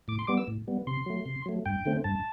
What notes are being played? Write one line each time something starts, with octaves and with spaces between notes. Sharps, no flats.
A2 D6
C6
G3 B3 D6
E6
A2
G3 B3
C3 C6
F#3 A3
C3
F#3 A3
G2 G5
D3 A3 C4
G2 A5